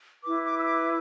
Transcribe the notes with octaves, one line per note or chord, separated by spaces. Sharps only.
E4 B4 D6
D6
E6
D6